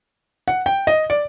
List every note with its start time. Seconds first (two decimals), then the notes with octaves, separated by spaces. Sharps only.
0.48 F#5
0.66 G5
0.87 D#5
1.10 D5